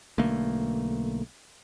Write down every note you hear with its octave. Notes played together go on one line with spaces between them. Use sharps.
B1 D3 A3 A#3